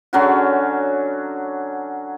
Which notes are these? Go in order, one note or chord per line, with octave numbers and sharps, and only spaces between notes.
D3 F#3 C#4 F#4